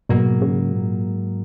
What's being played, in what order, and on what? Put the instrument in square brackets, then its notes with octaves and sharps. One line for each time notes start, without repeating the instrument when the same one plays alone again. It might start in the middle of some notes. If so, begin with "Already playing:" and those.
[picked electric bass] G#2 F#3 A#3 [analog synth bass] B2
[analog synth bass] C#3
A#2